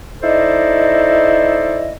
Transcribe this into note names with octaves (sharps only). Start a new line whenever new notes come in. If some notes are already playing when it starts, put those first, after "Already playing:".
D#4 E4 A4 C5 D5 D#5